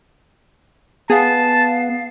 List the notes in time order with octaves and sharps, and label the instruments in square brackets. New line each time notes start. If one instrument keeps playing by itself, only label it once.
[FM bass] B3 [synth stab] G#4 [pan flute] F5 [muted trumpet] A5